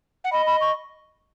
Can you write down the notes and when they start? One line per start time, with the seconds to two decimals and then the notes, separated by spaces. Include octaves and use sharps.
0.24 F#5
0.32 D#5 B5
0.46 B5
0.61 C#6